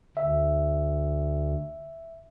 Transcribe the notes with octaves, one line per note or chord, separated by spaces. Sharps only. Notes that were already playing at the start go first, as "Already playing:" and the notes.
D2 E5